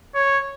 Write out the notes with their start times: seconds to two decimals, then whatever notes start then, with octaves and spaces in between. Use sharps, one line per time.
0.15 C#5